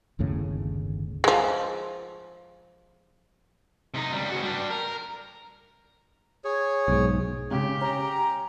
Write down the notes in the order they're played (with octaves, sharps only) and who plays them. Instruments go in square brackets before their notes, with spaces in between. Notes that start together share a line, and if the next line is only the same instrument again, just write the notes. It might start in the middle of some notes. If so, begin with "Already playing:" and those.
[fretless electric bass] G1 D#2 A2 C#3
[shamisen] F3 G#3
[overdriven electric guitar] C3 D#4
C#2 G3
C#3 F#4
G3 D4
A#4
[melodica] G#4 C#5
[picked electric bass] B1 G#2
[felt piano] C#3 G#3 [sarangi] G4
[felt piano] C#4 [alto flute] A#5